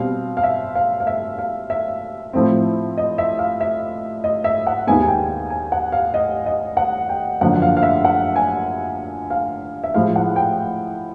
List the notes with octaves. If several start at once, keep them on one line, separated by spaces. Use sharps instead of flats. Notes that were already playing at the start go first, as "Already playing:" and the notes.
Already playing: B2 G3 C4 F5
F5
E5
F5
F5
E5
F5
E5
A2 F3 A3 C4
D#5
E5
F5
E5
D#5
E5
F#5
D#2 D#3 G#3 B3 G#5
G#5
G5
G#5
F#5
F5
D#5
D#5
F#5
G5
F#2 D3 F3 A#3 F#5
F5
F5
E5
F#5
G#5
F5
E5
A2 F3 G#3 F5
F#5
G5